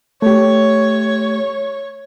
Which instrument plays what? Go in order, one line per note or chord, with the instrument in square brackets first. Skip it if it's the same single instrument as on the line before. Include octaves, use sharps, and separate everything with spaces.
[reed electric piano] A3 G4 [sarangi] C#5